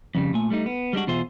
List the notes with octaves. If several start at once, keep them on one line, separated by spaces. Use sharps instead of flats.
F2 C#3 G3
A#2 A3 G#5
G3 A3 D4 D#4
B3
G3 G#3 D4 F#4
E2 B2 F4 G#4 C5 E5